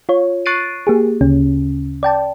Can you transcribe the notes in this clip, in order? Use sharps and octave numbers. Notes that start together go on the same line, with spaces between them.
F4 C#5
C#6 F#6 A6 C7 D7 D#7
A#3 G4 G#4
D2 C#3 C#4
D5 G5 A5